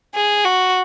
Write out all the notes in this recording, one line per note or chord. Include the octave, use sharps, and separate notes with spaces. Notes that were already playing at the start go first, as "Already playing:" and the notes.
G#4
F#4